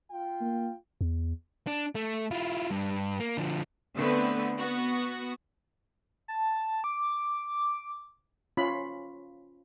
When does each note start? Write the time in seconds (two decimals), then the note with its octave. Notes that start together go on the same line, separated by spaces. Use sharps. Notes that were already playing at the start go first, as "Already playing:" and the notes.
0.11 F4 G5
0.41 A#3
1.01 E2
1.67 D4
1.95 A3
2.31 E4 F4
2.71 G2
3.20 A#3
3.37 D3 F3
3.96 D3 A3 B3 C4 B4
4.58 B3 F#4
6.28 A5
6.84 D6
8.57 C#4 F4 B5